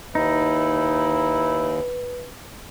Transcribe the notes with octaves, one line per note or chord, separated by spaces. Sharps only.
D#2 D#4 E4 B4